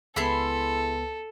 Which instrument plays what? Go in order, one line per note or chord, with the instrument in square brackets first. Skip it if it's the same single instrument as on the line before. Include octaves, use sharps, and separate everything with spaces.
[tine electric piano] C#2 B3 [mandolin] E4 G#4 C6 [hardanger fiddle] A4